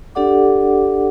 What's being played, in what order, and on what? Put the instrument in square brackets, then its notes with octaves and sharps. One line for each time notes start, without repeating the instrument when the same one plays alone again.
[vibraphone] D4 G4 A4 D5 F#5 D6